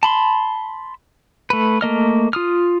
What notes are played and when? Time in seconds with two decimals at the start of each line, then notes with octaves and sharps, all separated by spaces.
0.03 A5 B5 C6
1.50 A3 B4
1.81 A3 A#3 D#5 F6
2.33 F4 D#6 F6